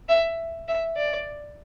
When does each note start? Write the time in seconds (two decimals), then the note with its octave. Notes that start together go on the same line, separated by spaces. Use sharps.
0.09 E5
0.68 E5
0.97 D5